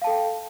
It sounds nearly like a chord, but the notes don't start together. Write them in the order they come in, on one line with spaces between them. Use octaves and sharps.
F5 A5 A4 G5